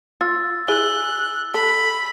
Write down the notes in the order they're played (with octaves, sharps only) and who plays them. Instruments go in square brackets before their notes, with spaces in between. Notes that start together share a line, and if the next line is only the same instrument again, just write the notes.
[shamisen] F4 [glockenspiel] E6 A6
[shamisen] E4 G#4 G#5 [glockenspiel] E6 G7 [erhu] F#6
[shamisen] A4 [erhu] B5